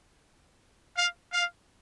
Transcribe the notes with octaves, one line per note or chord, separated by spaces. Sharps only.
F5
F5